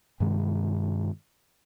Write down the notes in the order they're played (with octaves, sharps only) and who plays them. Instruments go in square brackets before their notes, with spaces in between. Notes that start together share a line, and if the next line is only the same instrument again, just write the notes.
[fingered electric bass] G2 C3 D#3 G#3